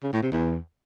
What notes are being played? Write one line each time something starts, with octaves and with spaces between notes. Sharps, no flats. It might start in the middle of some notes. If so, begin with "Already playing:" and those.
C#3
A2
C3
E2